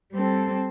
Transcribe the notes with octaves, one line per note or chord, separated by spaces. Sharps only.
G3 C4 A4